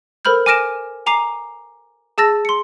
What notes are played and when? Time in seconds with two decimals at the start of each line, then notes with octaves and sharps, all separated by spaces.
0.25 A4 A#4 C5 B5 F6 G6
0.46 G#5 D6 F6 A#6 D7 E7
1.06 G#5 A#5 D6 C7 F7
2.18 G#4 A5 E6 A6 A#6
2.45 C6 C#7